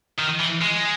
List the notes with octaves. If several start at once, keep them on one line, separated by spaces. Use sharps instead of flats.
D#3
E3
G#3